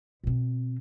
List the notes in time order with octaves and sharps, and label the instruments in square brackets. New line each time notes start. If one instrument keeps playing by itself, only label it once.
[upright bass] B2 C4